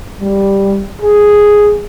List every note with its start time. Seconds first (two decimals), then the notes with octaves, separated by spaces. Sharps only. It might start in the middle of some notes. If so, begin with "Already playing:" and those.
0.21 G3
1.02 G#4